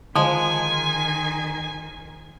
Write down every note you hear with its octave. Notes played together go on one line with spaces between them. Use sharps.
D3 D#3 F3 G#3 G#5